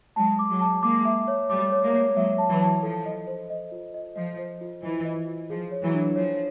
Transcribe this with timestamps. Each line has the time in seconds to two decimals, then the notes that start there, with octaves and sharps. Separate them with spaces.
0.16 F#3 G#3 A5
0.39 D6
0.50 F#3 G#3
0.61 A5
0.83 G#3 A#3 D6
1.05 E5
1.28 C#5
1.50 G3 A3 D6
1.72 C#5
1.83 G#3 A#3
1.94 C#5
2.16 F#3 G#3 E5
2.38 A5
2.50 E3 F#3
2.61 A5
2.83 F3 A4
3.05 D#5
3.27 C5
3.50 D#5
3.72 F4
3.94 D#5
4.16 F3 D#5
4.38 C5
4.61 F4
4.83 E3 D#5
5.05 D#5
5.27 F4
5.50 F3 G#4
5.71 C#5
5.83 E3 F#3
5.94 D4
6.16 F3 C#5